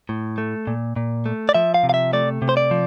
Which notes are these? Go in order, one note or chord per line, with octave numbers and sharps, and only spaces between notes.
A2
A3
A#2
A#2
A3
D5
F3 E5
F5
C3
F5
E5
A3 D5
C3
C5
D5
F3